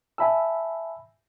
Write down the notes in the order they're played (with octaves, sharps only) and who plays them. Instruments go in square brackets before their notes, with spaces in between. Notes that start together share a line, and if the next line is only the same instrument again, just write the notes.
[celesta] E5 A5 [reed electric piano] G#5 B5 E6